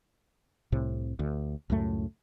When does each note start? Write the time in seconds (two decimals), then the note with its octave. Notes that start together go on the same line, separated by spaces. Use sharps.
0.72 C2 A2 C3
1.19 D2
1.70 C#2 F#2 A2 A3